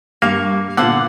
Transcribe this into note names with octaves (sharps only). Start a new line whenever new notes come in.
G2 A#3 F5 C#6
A#2 D3 B3 F4 C5 F#5